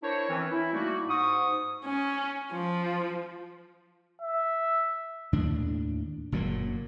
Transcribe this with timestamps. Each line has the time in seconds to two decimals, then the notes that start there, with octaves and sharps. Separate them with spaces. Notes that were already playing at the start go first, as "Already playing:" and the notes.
0.03 D4 E4 A#4 C5 C#5
0.29 E3 C4 C#4
0.52 E4
0.73 G3 A3 A#3 D#4 F#4
1.09 G#2 C#6 D#6
1.84 C#4
2.52 F3
4.22 E5
5.33 D#2 A2 D4
6.32 F#1 A#2 F#3 A#3